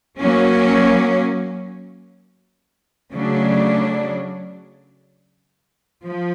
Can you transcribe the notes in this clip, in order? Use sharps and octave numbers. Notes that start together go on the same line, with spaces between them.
F#3 A#3 C#4
C#3 F#3 A3 D4
F3